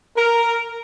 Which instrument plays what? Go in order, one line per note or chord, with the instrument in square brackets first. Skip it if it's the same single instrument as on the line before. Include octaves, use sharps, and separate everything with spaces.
[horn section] A#4